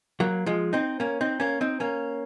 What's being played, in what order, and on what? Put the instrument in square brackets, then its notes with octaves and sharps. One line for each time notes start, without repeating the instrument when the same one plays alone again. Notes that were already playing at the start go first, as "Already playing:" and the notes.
[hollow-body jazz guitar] F#3 A#3
F3 G#3
C4 D#4
A#3 C#4
C4 D#4
A#3 C#4
C4 D#4
A#3 C#4